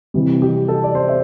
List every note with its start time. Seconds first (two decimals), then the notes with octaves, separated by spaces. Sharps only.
0.14 C3 E3 G3
0.42 G4
0.68 A4
0.84 D5
0.95 C5
1.09 E5